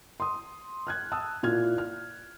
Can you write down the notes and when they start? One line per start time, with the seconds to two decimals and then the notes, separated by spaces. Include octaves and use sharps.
0.20 C6 D#6
0.87 F6 F#6 G#6
1.12 A5 D#6 E6
1.43 A#2 E4 F6 G#6
1.78 F6